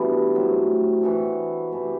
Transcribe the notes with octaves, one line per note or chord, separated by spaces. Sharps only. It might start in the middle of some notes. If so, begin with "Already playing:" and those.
Already playing: B2 E3 G3 A3 B3 D4
A2 F#3 C4
E3 B3 F#4 A4
C3 E3 A3